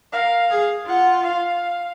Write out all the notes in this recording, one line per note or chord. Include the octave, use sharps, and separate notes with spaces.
A#4 F5
G#4
F4 F#5
F5